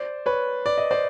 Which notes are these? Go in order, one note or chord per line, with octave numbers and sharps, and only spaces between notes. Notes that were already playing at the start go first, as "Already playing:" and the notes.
Already playing: C5 D5
B4 C#5
D5
D#5
C5 D5